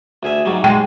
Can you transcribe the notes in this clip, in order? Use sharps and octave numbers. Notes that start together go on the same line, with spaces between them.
D2 G#4 E5
G#2 F#3 G3
G#3 G5